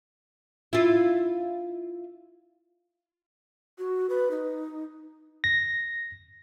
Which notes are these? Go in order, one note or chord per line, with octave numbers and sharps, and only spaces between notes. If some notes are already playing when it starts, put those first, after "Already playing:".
E4 F4
F#4
B4
D#4
A#6